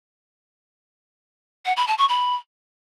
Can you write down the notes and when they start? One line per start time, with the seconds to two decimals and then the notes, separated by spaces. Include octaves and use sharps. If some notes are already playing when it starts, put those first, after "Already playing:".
1.66 F#5
1.77 B5
1.87 A5
1.98 C#6
2.09 B5